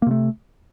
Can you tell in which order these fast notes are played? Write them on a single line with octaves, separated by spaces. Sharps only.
A#3 C3 A3